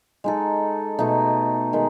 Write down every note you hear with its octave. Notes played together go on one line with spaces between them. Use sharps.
G#3 D#4 A4
B2 A3 D#4
D#3 G#3